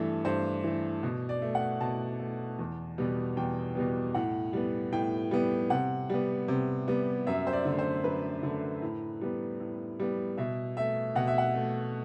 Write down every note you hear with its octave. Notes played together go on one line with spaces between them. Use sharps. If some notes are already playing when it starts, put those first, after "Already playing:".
Already playing: G2 E3 A3
G2 C5
E3 A3
B2
D5
A3
F#5
B2 A5
A3
E2
B2 G3 B3
E2 G5
B2 G3 B3
A2 F#5
G3 B3
A2 G5
G3 B3
C3 F#5
G3 B3
C3
G3 B3
F#2 E5
C5
D5
D3 A3
C5
F#2 B4
D3 A3
A2
G3 B3
A2
G3 B3
B2 E5
A3 E5
B2 F#5
E5
F#5
A3